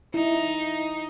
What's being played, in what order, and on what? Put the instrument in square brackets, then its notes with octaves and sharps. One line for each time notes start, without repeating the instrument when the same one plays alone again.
[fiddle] D#4 [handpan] E4